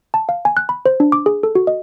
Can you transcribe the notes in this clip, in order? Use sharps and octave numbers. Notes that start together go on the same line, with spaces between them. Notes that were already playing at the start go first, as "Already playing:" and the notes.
A5
F5
G#5
F#6
B5
C5
D4
D6
G#4
A4
F#4
D#5